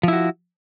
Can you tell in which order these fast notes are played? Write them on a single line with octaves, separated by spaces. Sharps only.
F3 E4 F#4